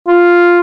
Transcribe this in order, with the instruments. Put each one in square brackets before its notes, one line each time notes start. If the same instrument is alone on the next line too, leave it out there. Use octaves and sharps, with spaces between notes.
[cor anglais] F4